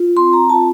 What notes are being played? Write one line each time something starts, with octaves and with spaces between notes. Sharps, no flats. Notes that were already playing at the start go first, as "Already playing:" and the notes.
Already playing: F4
C4 C6
A#5
F4 A5